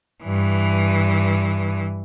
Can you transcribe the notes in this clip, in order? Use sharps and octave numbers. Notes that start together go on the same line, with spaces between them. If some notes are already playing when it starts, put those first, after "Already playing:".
G2 E3